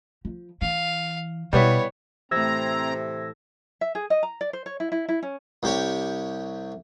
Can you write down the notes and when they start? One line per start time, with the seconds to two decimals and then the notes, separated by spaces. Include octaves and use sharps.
0.25 F3
0.62 E3 F5
1.53 B2 G3 B3 E4 C#5
2.31 A2 C3 E3 C4 A#5 E6 G#6 A#6
3.81 E5
3.95 G#4
4.10 D#5
4.23 A#5
4.41 D5
4.53 C5
4.66 C#5
4.80 E4
4.92 E4
5.09 E4
5.23 C#4
5.63 C2 G4 C#5